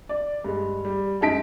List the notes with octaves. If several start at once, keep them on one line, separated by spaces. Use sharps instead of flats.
D5
G2 G#3
G3
F#2 G#3 D#4 A5 B6 D7